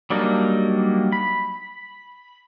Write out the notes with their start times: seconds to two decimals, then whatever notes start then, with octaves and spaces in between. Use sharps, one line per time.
0.10 F#3 G3 A#3 D4 D#4
1.12 B5